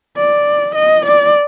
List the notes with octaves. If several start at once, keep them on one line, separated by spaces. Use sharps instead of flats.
D5
D#5
D5